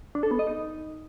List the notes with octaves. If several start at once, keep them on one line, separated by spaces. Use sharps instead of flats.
D4
A4
B3
D#5
D#4